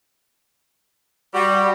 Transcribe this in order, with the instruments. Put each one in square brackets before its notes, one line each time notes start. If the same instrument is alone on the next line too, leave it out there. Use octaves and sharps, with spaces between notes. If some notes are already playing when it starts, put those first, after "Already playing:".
[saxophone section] G3 [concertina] F#4 G4